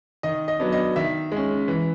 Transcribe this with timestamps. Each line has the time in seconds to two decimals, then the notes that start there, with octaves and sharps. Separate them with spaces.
0.23 D#3 D#5
0.48 D#5
0.60 F#3 B3 D4
0.72 D#5
0.96 D#3 E5
1.32 G#3 C#4
1.68 E3